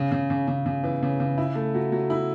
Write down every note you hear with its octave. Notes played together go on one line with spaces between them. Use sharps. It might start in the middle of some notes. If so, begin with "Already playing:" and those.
Already playing: C#3
C#3
C#3
C#3
C#3
E3
C#3
C#3
E4
A3
F#3
F#3
E4